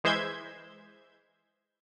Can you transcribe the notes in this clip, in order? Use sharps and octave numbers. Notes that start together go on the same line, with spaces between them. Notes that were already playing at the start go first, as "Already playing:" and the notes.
E3 G#3 C5 E5 G6 G#6